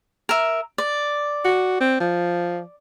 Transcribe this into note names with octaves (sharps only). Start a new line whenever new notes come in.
A#4 E5
D5
F#4
C4
F3